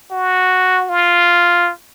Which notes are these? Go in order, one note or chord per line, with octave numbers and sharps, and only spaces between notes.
F#4
F4